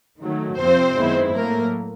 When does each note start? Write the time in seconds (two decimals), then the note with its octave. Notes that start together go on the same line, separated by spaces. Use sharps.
0.21 D#3 F#3 A3
0.59 F2 C3 F3 C4 C5
0.97 F#2 D#3 G#3 B3 E4
1.35 A2 F#3 A3 A#3 A#4